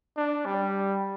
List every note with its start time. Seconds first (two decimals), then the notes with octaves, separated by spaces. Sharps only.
0.17 D4
0.45 G3